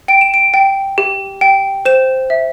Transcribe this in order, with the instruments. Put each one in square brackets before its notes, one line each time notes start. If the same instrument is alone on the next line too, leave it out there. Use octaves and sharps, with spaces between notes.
[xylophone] G5 D7
E7
D7
G5
G4
G5
C5 E7
E5